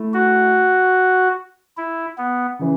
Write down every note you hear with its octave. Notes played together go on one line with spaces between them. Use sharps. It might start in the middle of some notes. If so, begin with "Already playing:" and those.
Already playing: A3 E4
F#4
E4
B3
C#3 E3